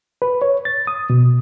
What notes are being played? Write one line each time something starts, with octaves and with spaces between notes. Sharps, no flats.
B4
C#5
A6
D#6
B2